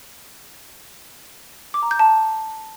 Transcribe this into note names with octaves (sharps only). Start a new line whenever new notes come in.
D6
A#5
G6
A5